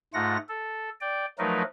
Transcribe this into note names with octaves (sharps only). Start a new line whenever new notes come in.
G#2 A3 F4 F#5 A#6
A4
D5 G5
F3 F#3 A3 D#4 A#4 B4